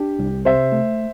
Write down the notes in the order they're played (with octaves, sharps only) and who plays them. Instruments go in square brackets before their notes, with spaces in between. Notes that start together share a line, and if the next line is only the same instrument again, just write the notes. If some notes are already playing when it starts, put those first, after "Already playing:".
Already playing: [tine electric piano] D4 [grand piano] G4
[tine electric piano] C2
[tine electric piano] C3 [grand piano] C5 E5
[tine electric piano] A3